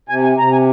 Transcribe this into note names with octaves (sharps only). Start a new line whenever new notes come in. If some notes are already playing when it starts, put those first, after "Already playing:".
C3 G#5
G#5
C3 A#5
G#5